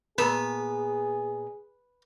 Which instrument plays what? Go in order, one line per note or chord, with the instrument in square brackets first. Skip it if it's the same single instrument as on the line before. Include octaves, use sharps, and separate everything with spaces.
[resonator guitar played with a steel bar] A#2 B3 A5 [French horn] G#4 [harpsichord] B4